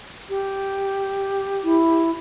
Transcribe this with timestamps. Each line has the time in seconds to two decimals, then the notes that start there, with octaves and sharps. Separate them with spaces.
0.29 G4
1.63 E4